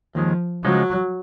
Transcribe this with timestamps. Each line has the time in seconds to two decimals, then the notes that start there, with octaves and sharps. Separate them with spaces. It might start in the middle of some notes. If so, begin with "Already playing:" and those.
0.15 D#2 D#3 F3 G#3
0.64 C#2 C#3 F3 F#3 G#3 D#4